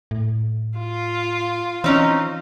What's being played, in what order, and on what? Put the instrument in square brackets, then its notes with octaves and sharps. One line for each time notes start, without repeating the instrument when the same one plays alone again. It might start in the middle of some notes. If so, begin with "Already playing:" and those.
[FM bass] A2
[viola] F4
[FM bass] E3 [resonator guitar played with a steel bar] C4 C#4 D#4